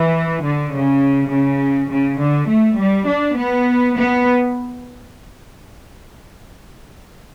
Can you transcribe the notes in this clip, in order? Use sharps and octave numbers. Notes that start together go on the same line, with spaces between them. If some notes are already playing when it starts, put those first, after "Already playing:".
Already playing: E3
D3
C#3
C#3
C#3
D3
A3
G3
D4
B3
B3